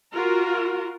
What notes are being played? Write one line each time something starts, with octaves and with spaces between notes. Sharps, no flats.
F4 F#4 A#4